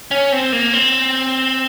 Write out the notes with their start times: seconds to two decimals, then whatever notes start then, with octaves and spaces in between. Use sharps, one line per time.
0.11 C#4
0.32 C4
0.53 A#3
0.73 C4